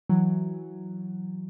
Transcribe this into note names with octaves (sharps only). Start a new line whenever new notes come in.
E3 F#3